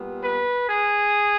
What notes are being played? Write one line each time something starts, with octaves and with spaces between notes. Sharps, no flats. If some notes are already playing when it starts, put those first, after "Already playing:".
Already playing: A#2 G3 B3
B4
G#4